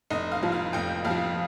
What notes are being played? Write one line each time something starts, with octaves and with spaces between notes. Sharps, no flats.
F1 D#5
F5
F2 F3
F5
F1 G5
F2 F5
F3